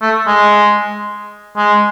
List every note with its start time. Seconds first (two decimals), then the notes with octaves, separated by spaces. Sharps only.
0.02 A3
0.27 G#3
1.57 G#3